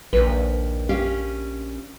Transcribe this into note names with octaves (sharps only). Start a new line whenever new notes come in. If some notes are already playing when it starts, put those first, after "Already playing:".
A#1 D#2 B4
C#4 G4 F5